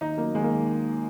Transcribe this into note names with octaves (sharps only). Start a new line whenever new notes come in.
D#2 D#4
F#3 A#3
D#2 G#3
A#3
D#3